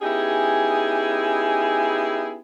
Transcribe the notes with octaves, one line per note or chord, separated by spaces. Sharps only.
B3 C#4 D#4 E4 G4 G#4